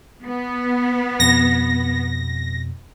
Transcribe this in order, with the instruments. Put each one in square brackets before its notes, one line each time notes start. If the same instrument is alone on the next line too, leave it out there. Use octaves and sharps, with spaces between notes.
[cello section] B3
[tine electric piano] F2 B2 [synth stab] A#6